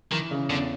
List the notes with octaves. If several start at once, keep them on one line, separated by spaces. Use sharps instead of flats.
D#3 E3
C#3
E2 D3